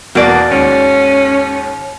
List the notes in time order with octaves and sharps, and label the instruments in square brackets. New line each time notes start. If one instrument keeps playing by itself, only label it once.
[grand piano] E2 B2 [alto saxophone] A#3 [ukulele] F#4 D5
[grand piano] D#2 G#2 [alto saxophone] C#4